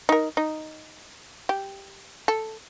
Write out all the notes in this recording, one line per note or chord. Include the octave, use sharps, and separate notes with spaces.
D#4 A#4
D#4
G4
A4